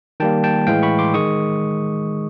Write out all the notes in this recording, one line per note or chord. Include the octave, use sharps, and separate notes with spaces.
D#3 G3 A#3 G5 A5
G5 A5
A2 E3 G#3 F5 G5
B5 C#6
C6 D6
D#3 G#3 C#6 D#6